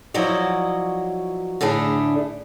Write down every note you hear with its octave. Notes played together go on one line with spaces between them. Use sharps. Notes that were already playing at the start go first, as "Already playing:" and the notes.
F3 F#3 E4 F#4 D5 D#5
A2 D3 A3 D4 G#4